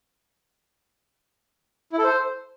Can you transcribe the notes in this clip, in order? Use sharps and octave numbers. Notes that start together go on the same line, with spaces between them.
E4
A4
C5